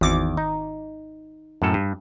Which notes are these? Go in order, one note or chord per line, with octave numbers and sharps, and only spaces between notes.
G#1 E2 D6
D#4
F#2 A2 A4
G2